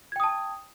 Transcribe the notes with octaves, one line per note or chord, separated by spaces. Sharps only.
G5 A5 D#6 G#6